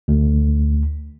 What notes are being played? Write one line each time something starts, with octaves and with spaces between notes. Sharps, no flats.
D2